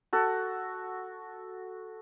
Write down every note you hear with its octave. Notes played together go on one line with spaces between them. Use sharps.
F#4 A4